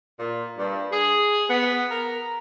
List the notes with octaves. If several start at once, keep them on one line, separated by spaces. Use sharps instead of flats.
A#2
G2
G#4
B3
A#4